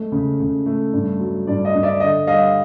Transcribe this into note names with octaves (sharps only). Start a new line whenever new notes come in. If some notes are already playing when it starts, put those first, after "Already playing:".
Already playing: G#3 A3
C#3
C#3
A3
G2
F#3
G2 D5
D#5
G2
D5 E5
D3 D#5
G3 D#5 F5